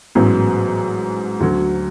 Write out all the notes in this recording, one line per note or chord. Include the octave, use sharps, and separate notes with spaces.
A1 G#2 F#3 B3
D2 D3 F#3